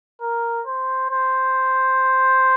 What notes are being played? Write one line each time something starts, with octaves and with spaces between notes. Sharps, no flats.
A#4
C5
C5